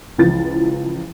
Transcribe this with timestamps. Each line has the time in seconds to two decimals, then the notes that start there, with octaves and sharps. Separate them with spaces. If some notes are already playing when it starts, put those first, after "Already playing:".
0.18 C#2 E3 F3 A6